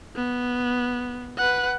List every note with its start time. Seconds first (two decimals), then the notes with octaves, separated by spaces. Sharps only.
0.16 B3
1.38 B4 F#5